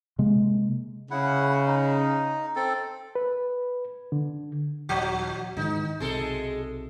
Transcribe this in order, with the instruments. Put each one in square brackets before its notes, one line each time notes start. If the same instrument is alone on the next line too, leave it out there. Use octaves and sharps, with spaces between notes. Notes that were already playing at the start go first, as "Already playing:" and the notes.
[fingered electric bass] C3 G#3 A#3
[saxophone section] C#3 [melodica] E4 F#5
[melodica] D#4
C4 A4
[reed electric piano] B4
D3
[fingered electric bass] D#1 [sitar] F3 F#4
[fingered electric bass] G#2 D#3 E3 [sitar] D#4
[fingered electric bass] B1 C3 [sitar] G#3 A4